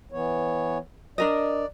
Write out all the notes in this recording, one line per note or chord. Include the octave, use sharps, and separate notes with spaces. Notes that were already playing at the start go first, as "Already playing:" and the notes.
E3 B3 C#5
D4 A#4 D5 D#5